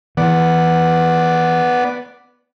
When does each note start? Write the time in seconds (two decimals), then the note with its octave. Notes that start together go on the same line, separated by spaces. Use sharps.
0.17 E3 B3 D5 F#5